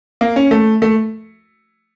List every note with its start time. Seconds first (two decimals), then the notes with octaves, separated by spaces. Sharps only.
0.21 A#3
0.36 C#4
0.51 A3
0.82 A3